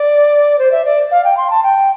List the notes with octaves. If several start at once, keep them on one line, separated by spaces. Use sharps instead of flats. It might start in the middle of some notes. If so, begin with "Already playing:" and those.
Already playing: D5
C5
E5
D5
F5
G5
C6
A5
G5